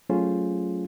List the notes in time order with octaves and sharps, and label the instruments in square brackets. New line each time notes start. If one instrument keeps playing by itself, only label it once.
[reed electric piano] F#3 A3 C#4 F4 G#4 C5